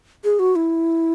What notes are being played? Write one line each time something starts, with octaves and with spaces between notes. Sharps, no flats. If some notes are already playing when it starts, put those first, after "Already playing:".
G#4
F#4
E4